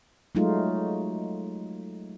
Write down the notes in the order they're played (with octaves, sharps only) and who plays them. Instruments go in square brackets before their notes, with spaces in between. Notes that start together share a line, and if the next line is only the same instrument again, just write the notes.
[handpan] F#3 G#3 A3 D#4 F4